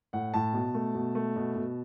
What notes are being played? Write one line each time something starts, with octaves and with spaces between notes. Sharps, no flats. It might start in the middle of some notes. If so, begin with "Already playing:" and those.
A2 F#5
A2 A5
B2
A3
B2
A3
B2
B2